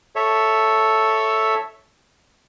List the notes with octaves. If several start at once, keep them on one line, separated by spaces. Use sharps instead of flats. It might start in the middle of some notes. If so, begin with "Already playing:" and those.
A4 C#5 E5